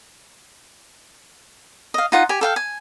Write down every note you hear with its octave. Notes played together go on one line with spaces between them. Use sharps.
D#5 F5
D#4 F4 F#5
G4 G#5
A4 F5 G5
G#5